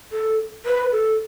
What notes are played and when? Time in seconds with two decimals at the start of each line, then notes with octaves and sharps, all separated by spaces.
0.12 A4
0.66 B4
0.92 A4